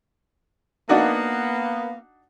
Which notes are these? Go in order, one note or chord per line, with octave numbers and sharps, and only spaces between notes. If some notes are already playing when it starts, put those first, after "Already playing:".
A#3 B3 D4 D#4 F#4